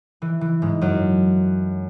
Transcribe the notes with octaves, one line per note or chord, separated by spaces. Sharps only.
E3
E3
G#2 G#3
F#2 F#3